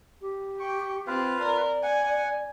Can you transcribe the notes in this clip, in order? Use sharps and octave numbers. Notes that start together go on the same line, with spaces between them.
G4
G5 C#6
C4 F4 B4 F5
A#4 D5
F#5 G#5